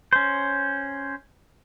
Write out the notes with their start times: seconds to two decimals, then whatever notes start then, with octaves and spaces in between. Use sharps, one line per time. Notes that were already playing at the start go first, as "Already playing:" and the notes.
0.13 C#4 C5